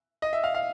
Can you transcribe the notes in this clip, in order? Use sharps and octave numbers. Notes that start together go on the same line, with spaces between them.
D#5
E5
F5
F5